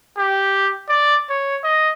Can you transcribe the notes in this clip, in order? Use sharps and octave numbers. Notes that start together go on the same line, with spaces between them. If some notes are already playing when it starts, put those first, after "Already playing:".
G4
D5
C#5
D#5